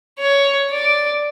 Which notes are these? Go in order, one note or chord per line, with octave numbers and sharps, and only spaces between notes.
C#5
D5